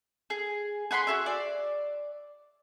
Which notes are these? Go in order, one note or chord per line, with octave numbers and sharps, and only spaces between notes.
G#4
G#4 F#5 B5 C6
F#4 G#4 E5
D5